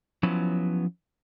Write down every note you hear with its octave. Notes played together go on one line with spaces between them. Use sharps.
F3 F#3 B3 C#4 E4